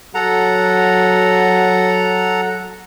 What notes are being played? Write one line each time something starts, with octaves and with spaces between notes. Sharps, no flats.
F#3 A4 F#5 A#5